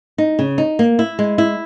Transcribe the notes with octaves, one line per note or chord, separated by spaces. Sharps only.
D#4
C#3
D#4
A#3
E4
G#3
E4